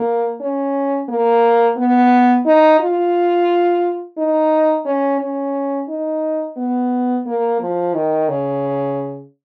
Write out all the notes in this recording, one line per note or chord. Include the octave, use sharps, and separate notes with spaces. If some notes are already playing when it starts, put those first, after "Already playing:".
Already playing: A#3
C#4
A#3
B3
D#4
F4
D#4
C#4
C#4
D#4
B3
A#3
F3
D#3
C#3